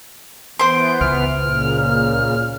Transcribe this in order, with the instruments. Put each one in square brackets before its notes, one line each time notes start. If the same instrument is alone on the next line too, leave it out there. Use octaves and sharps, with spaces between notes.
[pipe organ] E3 B3 [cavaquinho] C5 C6 [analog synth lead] D7
[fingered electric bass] C#2 [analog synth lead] F6
[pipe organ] A#2 C#3